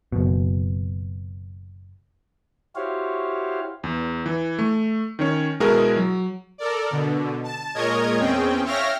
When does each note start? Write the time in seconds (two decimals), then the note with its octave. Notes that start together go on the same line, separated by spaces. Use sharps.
0.12 F#1 B2
2.76 E4 F#4 G4 C5 C#5 F5
3.84 E2
4.26 E3
4.59 A3
5.19 D#3 C#4 C#5
5.60 B2 G#3 E4 F#4 G#4 A#4
5.96 F#3
6.58 A4 A#4 D5
6.91 B2 D3
7.44 A5
7.75 A#2 G#3 A#4 C#5 D#5 G#6
8.20 E2 C4 C#4 G#4 G5
8.65 C#5 E5 F5 G5 F6 A#6